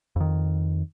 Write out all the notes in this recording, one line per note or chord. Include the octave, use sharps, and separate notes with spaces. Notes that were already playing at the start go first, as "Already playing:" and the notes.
F2 D#3